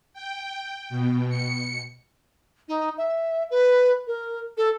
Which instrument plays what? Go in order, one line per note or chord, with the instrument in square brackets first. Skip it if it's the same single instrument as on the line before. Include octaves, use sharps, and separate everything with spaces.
[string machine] G5
B2
C#7
[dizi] D#4
E5
B4
A#4
A4